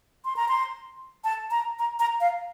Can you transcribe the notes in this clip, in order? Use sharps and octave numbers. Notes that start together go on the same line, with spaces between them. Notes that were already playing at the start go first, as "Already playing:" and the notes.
C6
A#5
C6
A5
A#5
A#5
A#5
F5